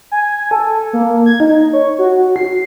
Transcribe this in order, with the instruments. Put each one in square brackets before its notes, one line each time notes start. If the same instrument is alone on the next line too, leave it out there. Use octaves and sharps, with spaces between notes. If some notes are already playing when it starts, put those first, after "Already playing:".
[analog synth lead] G#5
A4
A#3
G#6
D#4
C#5
F#4
C7